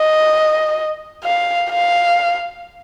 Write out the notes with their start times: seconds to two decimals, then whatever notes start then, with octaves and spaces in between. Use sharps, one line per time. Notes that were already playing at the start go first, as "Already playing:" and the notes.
Already playing: D#5
1.24 F5
1.70 F5